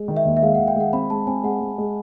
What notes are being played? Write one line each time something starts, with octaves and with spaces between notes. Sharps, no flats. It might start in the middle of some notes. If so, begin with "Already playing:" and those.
Already playing: G#3
D#3
E5
D#2
E5
G#3 F5
F#5
D#3
G5
G#3 F#5
C4 B5
G#3 A5
C4 G#5
G#3 F#5
G#3
G#3